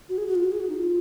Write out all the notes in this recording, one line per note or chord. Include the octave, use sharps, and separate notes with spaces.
F#4
G#4
F#4
F4
F#4
G#4
F#4
D#4
F4